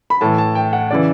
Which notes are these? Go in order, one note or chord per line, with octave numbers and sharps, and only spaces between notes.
B5
A2 E3 A5
A5
G5
F#5
C#3 E3 D5